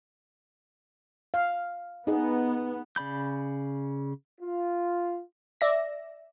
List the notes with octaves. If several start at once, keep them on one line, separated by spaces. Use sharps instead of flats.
F5
B3 D#4 G#4 D#5
C#3 D5 B5 G6
F4
D5 E5 A#6